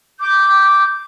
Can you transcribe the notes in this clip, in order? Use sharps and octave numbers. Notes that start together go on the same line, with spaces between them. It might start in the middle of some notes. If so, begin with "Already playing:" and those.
D6 G6